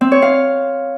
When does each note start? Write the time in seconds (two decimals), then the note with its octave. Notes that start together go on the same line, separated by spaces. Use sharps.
0.01 C4
0.12 C#5
0.22 F5